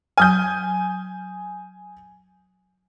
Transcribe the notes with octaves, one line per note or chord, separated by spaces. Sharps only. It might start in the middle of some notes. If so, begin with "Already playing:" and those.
F#3 G#5 D#6 F6 G6